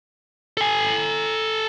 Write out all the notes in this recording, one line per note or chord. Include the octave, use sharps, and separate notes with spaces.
A4 G#5